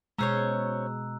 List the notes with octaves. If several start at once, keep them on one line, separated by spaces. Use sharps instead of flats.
B2 G#3 C#4 C5 C#5 A#5 E6 F#6